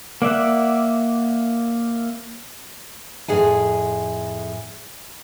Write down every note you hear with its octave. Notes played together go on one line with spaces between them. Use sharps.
A#3 D5 E5 F#5
F2 A2 G#3 G#4 F#5 G#5